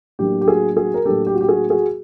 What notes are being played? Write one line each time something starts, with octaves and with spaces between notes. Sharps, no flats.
A2 F#3 A#3 D4 G4
G4
F#4 G#4
F#4 G#4
A#4
A2 F#3 A#3 D4 G4 A4
G4
F#4
G4
F#4 G#4
F#4 G#4